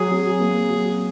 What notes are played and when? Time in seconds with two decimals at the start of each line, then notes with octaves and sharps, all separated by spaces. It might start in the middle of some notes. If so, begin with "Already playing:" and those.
Already playing: F#3 G#4
0.11 F#3
0.41 A#3
0.70 F#3